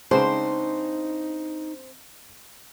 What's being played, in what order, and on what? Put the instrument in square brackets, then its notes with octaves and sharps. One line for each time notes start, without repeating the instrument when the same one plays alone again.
[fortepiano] C#3 G#3 B4 [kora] C4 D4 [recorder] D#4 [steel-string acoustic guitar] C5